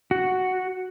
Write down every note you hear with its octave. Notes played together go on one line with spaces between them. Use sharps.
F#4